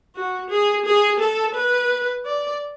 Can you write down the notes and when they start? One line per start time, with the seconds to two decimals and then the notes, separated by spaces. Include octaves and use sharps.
0.16 F#4
0.50 G#4
0.85 G#4
1.20 A4
1.55 B4
2.26 D5